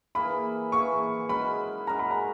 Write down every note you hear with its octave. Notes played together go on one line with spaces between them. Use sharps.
E3 A#3 E4 G#4 B5
E3 A#3 E4 G#4 C#6
G#3 C#4 F#4 A#4 B5
G#3 C#4 F#4 A#4 A#5
B5
A#5